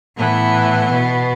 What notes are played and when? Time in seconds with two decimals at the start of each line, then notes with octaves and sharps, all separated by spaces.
0.17 A2 E3 B3
0.91 B2